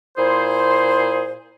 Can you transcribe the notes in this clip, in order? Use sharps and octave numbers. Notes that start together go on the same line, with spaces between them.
A#2 E4 G#4 C5